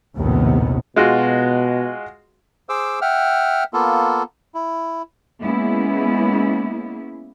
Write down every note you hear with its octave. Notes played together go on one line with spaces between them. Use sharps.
A#1 D#2 A2 C3 D#3 B3
B2 G#3 F4 F#4
G#4 C5 D6 E6
E5 F#5 G5 F6
A#3 B3 F4 A4
E4
G#3 A#3 B3 C#4 E4